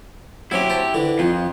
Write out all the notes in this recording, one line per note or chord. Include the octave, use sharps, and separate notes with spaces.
F#3 C4 C#4 E4 G4
C5 A5
D3 E3
F2 F3